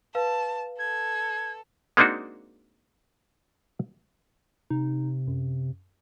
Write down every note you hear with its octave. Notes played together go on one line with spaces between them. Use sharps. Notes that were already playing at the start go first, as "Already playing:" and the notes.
B4 F5 A5
A4 G#6
G#3 A#3 C4 D4 D#4 F#4
C3 D#4
F#2